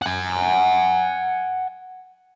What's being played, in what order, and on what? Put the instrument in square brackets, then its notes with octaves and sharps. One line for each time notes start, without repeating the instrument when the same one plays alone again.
[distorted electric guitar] F#5 G#5